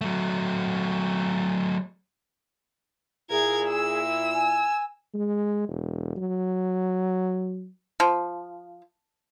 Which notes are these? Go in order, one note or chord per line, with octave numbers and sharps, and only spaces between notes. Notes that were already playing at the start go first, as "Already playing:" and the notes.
F#3 A3
A#2 E4 G#4 A#4 G#6
E6
G#5
G#3
E1
F#3
F3